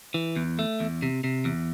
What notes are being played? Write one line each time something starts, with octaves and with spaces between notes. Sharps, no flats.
E3
E2
A3
E2
C3
C3
E2